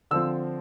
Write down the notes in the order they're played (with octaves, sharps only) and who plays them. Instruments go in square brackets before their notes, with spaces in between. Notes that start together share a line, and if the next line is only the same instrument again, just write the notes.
[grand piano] D3 F3 C4 E6